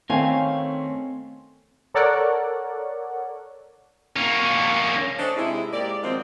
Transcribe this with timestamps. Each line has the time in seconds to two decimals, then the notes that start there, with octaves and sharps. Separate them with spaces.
0.10 D#3 A3 C4 C#4 F5 G#5
1.94 A4 A#4 C#5 D5 F#5
4.16 A#3 C#4
5.19 C#4 D4 A4 C5 C#5 D#5
5.36 C3 G#3 D#4 E4
5.73 G#2 A#3 G4 D5
6.03 D#3 F3 F#3 G#3 C4